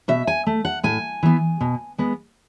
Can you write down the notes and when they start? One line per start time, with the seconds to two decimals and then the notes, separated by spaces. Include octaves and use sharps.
0.08 B2 E5
0.27 G#5
0.47 A3
0.65 F#5
0.84 A2 G#5
1.23 E3 B3
1.61 B2
1.98 G#3 B3